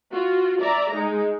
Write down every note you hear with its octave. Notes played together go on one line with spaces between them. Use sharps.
F4 F#4
D5 E5 A#5
G#3 D#4